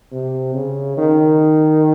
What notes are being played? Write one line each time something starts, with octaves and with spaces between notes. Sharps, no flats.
C3
C#3
D#3